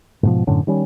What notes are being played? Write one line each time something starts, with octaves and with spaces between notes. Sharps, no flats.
G#2 B2 F3
F#2 A2 D3 C#4
D#3 G3 C#4